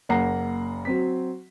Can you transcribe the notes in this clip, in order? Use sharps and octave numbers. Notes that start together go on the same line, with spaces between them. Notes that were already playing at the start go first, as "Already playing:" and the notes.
F#1 A#3 F#5 A#5 C7
F#3 C4 B6